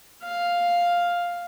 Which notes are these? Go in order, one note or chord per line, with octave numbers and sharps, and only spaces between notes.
F5